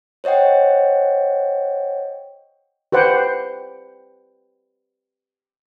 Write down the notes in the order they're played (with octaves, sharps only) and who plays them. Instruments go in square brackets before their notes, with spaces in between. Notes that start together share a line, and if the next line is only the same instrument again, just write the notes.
[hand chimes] C5 C#5 D#5 F#5 G5
[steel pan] G4 B4 C5 F#5 G5